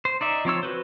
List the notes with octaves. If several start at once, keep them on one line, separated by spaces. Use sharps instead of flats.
C5
D#4 D5 E5
F3 C4 C#5 E6
F#4 B4 C5